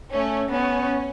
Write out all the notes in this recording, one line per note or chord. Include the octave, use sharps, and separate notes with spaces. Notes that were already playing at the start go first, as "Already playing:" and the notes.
A3 C#4
B3 C#4